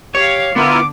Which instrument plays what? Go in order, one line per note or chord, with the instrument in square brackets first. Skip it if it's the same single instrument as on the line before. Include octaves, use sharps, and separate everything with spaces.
[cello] G4 F5 [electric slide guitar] C#5
[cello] D3 [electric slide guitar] B3 [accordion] E4 F4 A#4 [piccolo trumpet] D6